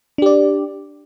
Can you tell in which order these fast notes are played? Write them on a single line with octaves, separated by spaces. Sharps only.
D4 G4 D5